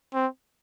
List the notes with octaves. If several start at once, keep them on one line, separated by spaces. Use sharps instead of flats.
C4